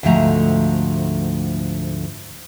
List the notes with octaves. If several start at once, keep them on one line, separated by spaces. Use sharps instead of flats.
D2 G#2 D3 F3 A3 A#5